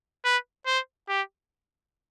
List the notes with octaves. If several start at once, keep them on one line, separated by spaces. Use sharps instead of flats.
B4
C5
G4